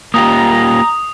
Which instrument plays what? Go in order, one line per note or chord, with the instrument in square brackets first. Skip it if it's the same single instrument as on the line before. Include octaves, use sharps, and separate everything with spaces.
[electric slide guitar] A#3 F4 G4 [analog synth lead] A#5 [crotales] D#6